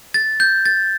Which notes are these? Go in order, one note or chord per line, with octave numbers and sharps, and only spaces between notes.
A6
G6
A6